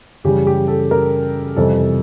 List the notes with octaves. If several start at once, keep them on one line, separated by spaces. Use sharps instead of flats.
F#2 C#3 E3 G3 G4
G4
A4
A#4
F2 C3 E3 G3 A4